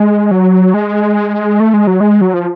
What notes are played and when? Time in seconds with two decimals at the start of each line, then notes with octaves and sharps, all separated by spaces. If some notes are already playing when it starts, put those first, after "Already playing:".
Already playing: G#3
0.31 F#3
0.74 G#3
1.60 A3
1.74 G#3
1.87 F#3
2.00 G#3
2.21 F#3
2.34 F3